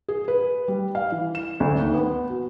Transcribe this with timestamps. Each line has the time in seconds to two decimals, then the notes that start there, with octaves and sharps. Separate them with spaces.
0.08 G#4
0.28 B4
0.68 G3
0.95 F5
1.12 E3
1.35 E7
1.60 D2
1.79 D#2
1.94 B3
2.30 F#4